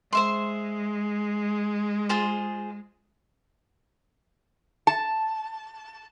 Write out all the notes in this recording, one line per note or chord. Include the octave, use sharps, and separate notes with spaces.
G#3 C5 E5 C6
F4 G#4 C5
A5